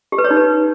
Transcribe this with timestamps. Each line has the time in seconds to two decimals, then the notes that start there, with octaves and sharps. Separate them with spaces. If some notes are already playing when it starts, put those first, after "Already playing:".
0.12 G4
0.18 B4
0.24 C#5
0.30 D#4
0.37 B4